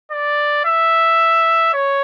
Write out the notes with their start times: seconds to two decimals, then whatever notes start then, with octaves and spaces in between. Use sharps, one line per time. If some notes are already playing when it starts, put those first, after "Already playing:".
0.11 D5
0.65 E5
1.74 C#5